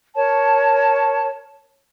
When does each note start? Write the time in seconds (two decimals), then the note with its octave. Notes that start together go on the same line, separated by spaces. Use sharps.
0.15 A#4 C#5 A5